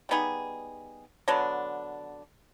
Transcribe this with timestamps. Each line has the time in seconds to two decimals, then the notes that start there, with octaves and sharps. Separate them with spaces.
0.09 G3 B3 D#4 G#4
1.28 D3 F#3 B3 D4